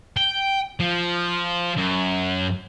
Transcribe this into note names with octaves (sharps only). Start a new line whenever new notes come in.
G5
F3
F#2